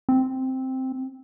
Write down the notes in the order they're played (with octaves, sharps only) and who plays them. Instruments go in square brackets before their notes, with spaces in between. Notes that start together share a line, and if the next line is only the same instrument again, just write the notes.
[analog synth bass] C4